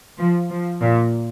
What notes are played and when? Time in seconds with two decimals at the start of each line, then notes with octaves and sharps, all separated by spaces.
0.18 F3
0.49 F3
0.81 A#2